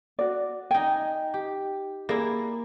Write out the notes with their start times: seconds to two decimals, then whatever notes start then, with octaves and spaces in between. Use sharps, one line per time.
0.19 F#4 D5
0.71 D#4 G5 G#5
1.34 G4
2.09 A#3 E4 G#4 D5